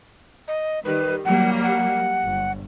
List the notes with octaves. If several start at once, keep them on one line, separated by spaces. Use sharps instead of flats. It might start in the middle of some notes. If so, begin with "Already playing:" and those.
D#5
D#3 G3 B4
F#3 G3 A#3 F#5
F#5
G1